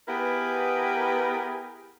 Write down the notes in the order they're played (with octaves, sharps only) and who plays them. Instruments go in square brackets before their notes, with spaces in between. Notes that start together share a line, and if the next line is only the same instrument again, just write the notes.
[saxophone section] B3 E4 G4 G#4 A#4 B4